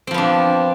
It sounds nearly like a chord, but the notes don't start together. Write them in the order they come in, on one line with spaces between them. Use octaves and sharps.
C4 F3 B3 D4